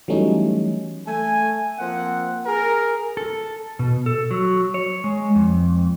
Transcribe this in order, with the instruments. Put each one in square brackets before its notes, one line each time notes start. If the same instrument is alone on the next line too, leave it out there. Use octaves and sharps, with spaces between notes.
[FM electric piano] E3 F#3 G3 A3 C#4 D#4
[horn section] A3 G#5
F3 A#3 C4 F#5
G#4 A#4
[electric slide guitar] A4
B2
A4
F#3
C#5
G#3
F2